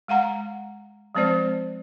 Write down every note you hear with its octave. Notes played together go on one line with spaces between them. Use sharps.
G#3 F5 F#5 A#5
F3 G#3 C4 C5 D5